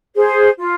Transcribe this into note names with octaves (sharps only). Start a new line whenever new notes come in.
G#4 C5
F4